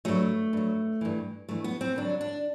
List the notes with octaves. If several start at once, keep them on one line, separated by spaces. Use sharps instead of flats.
G2 F#3 A3
G2 F#3
G2 E3
G2 E3 A3
B3
C4
G2 D3 F#3 D4
D4